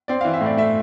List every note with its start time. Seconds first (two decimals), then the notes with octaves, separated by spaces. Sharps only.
0.08 C4 D5
0.21 E3 F5
0.34 E5
0.41 A2
0.46 D5
0.57 A3 E5